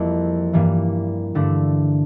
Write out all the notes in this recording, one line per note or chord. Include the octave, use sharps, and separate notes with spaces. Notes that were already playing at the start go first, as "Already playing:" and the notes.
Already playing: F2 E3 G3 A#3 E4
G2 E3 G3 A#3
G2 D3 A3 D4